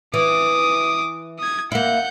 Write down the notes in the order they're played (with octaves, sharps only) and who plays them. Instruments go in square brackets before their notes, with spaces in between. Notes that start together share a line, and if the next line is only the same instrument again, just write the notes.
[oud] E3 [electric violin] D6 D#6
[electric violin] D#6 G#6
[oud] A#3 E4 [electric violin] F#5 G6